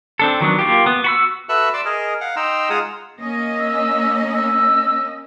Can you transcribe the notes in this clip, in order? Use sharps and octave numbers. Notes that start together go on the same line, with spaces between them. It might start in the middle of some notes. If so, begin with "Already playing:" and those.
C4 D4 A4
D#3 F#3 B3 D4
A#3 F4 G4
B3
F#4 B5 E6
F#4 A4 B4 E5 E6 F#6
D5 C6 D6 E6
G#4 A#4 D#5
F5 F#5
D#4 G5 A#5 C6 E6
G#3 F4 G#4 F#5 A#5 D#6
A#3 C#4 D#5
E6
E6